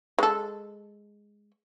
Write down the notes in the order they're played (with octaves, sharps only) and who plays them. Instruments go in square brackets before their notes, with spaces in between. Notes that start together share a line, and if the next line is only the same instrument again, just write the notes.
[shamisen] G#3 A4